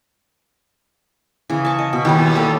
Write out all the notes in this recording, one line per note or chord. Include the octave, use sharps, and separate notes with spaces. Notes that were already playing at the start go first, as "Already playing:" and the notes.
C#3 E3
A5 C#6
D#5
B2
D#2 E3 G3 B4
G3 A#3 A4